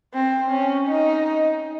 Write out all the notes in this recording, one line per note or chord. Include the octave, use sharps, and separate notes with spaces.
C4
C#4
D#4